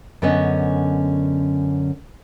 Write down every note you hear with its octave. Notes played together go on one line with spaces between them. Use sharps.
F#2 D3 B3 C#4 D#5